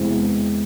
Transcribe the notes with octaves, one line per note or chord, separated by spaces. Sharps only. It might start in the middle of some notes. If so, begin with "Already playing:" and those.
Already playing: E2 C3 E3 G#3 C4